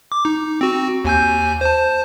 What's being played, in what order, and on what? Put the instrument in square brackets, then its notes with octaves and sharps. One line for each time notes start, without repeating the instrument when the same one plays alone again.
[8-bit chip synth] D6
D#4
C4 F#4
D#2 G#5 G6
C5 A5